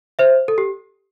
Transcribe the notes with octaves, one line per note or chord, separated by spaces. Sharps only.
C5 E5
A4
G4